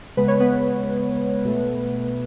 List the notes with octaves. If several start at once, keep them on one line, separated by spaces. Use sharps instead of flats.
C#3 G#3 B3 B4
C#5
B3 B4
B2 A3